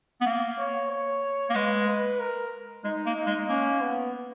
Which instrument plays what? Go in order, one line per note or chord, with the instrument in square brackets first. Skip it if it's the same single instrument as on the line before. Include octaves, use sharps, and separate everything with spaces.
[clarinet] B3
A#3
[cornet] C#5
C#5
[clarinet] A#3
[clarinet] G#3 [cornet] B4
[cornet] B4
A#4
[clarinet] G#3 [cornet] D#4
[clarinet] A#3
[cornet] D#4
[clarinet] G#3
[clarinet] A#3 [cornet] C#4
[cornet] B3